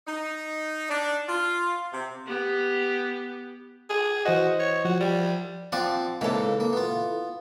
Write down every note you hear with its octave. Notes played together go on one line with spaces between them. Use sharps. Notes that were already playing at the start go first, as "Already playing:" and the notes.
D#4
D4
F4
C3
B3 G4
G#4
E3 F#4 C5 D#5
C#5
F3 F#4
G3
F3 C4 F4 D5 F#5
G#2 C#3 E3 A#3 A4
A#3
B3 F4